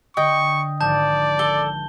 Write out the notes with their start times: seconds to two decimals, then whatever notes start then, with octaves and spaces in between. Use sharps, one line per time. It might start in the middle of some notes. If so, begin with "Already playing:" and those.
0.17 D3 D#5 G5 C#6
0.81 G#1 F3 D5 A5 G6
1.39 A4 G7